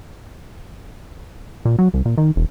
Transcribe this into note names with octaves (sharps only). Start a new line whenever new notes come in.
A#2
F#3
C2
A#2
D#3
E1